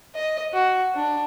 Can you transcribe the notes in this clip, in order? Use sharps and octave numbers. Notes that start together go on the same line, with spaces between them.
D#5
F#4
D4